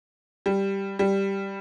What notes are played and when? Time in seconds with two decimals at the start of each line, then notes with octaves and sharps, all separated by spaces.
0.46 G3
0.99 G3